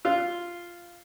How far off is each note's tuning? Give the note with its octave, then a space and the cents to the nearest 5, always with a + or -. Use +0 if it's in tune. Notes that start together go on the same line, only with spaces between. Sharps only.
F4 -5